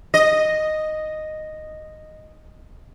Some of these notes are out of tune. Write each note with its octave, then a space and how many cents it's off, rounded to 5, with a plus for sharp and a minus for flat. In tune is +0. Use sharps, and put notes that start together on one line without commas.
D#5 -5